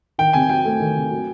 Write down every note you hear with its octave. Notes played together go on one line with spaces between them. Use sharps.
D#3 G5
C3 G#5
F#3 G5
A3
D#3
C3
F#3